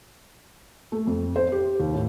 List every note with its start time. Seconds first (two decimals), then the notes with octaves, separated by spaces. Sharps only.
0.92 A3
1.07 F2
1.36 C5
1.52 G4
1.80 D#2
1.94 A2